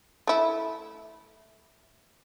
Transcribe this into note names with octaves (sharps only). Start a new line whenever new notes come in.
A3 E4